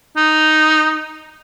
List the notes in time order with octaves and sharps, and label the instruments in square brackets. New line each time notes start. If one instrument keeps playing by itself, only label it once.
[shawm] D#4